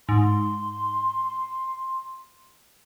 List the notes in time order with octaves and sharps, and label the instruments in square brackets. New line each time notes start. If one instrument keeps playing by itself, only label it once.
[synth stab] G#2 [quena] C6